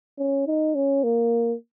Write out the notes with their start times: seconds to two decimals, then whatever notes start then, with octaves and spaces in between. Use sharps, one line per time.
0.18 C#4
0.47 D#4
0.75 C#4
1.03 A#3